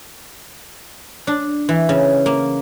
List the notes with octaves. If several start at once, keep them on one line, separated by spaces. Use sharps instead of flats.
D4
E3
C#3
A#3